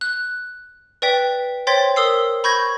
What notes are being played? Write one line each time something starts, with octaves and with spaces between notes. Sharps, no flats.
F#6
B4 D5 G5 B6
C5 C#5 G5 C6 A6 B6
A#4 D#6 E6 C7
B5 C#6 G6 G#6 A#6